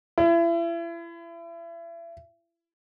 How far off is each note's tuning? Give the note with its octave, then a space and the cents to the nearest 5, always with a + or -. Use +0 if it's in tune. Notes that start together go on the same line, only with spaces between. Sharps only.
E4 +35